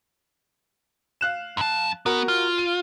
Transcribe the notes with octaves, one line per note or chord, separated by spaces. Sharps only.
F5 F#6 E7
F#2 A5
B3 F#4 A#4
F4
D#7